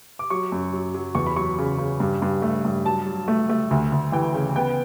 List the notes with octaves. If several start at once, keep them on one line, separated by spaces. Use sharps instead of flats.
D6
F#3 C#6
F#2
F#3
F#3
E2 C#6
B5
F#3 C#6
C#3
C#3
G2
G2
A3
G2
F#3 A5
F#3
A3
A3
D2
D2
E3 G5
C#3
B3 G5